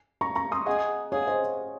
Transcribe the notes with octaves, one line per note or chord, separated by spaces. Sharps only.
A#5 C#6
A#5 C#6
C6 D#6
G#4 D#5 F#5
G#4 C#5 F5
C5 D#5